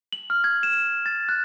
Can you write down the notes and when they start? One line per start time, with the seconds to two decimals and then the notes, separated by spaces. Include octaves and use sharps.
0.13 F#7
0.30 F6
0.44 G#6
0.63 E7
1.06 A6
1.29 F#6